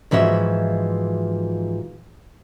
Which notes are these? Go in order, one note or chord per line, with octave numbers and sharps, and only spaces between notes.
G#2 E3 F3 F#4 E5